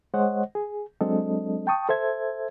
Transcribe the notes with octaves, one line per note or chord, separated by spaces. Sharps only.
G#3 C5 C#5 D#5 F#5
G#4
F#3 G#3 C4 D4 A4 D#5
G5 A5 C#6 D#6
A4 C5 E5 G#6